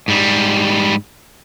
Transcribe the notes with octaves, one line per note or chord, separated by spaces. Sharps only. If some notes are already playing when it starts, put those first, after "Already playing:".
G#2 G3